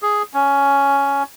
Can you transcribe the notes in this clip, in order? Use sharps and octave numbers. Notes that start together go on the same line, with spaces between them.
G#4
C#4